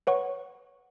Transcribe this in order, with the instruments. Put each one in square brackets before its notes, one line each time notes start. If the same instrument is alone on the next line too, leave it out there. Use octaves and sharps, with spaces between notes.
[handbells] B4 C#5 F#5 C#6